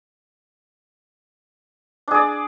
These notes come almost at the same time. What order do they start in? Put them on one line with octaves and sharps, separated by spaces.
D4 G#4 D5